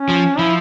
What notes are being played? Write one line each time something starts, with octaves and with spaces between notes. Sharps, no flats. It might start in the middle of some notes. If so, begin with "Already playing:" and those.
Already playing: C#4
F3
F3 E4